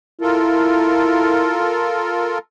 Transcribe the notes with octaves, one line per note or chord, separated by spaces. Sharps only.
E4 F4 A4 A#4